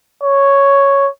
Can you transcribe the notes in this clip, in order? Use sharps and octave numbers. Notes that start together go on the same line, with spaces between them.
C#5